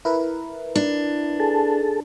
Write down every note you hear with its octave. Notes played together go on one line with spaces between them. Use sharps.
E4 A#4 B4
D4
G#4 A4 A5